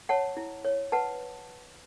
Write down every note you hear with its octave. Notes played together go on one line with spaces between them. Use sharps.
C#5 F#5 A5
E4
C#5
B4 F#5 A5